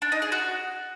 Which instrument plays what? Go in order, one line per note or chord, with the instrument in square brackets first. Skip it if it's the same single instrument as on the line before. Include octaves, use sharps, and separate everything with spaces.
[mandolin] D4
D#4
G#4
F#4